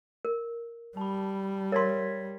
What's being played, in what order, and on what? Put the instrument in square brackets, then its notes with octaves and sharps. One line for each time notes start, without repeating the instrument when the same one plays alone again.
[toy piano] A#4
[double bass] G3 [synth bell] A5 B5
[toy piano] A#4 C6 [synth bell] C#5 G#6 B6